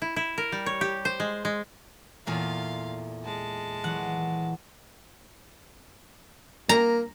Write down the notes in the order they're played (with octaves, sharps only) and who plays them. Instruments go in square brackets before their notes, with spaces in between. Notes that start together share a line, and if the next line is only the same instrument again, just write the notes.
[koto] E4
E4
A#4
G3
C#5
G4
C5
G#3
G#3
[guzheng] E2 A#2 A3 [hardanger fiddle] F5 C6
[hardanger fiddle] G#3 A5
[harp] E3 F#3 [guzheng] F#5
[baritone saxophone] A#3 [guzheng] A#5